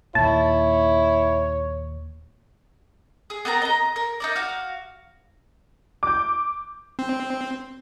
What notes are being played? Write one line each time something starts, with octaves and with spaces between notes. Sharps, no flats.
D#2 A#2 E4 C#5 A5
G#4
B3 C4 A#4 A#5
D#5 A#5
A#4
D#4 A#4 D5
F#4 F5
D6 G6
C4